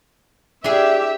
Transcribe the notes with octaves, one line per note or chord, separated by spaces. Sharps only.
D4 E4 G4 G#4 E5